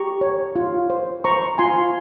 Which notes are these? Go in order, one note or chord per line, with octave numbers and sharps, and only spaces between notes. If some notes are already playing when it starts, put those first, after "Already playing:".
Already playing: G4 A#5 C#6
C#5
F4
C5
C5 A#5 C#6
F4 G#5 C6